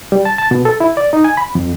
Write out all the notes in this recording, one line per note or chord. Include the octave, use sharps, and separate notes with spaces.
G3
A5
A5
B2
A4
E4
D5
D#4
G#5
B5
F2